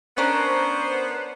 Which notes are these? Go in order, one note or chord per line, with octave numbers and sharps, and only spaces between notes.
B3 C#4 D4 A#4 C5